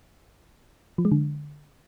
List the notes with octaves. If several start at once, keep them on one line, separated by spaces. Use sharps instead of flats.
F3
G#3
D3